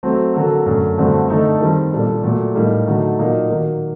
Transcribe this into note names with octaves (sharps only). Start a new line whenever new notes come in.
F#3 A3 C4
D3 F#3 A#3 F#4 A4
F#2 D3 A3
G2 D3 A3 C4 F#4
D3 A3 D#4 A4
D#3 G3 C4
A#2 G3 D4 A4
A#2 F#3 A3
A2 G3 A#3 D#4
D3 F#3 A3 D#4 A4
A#2 F#3 A#3 D#4
D#3 F#3 A#3 F#4